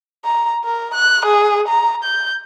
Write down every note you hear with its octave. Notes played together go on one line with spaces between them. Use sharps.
A#5
A#4
F#6
G#4
A#5
G6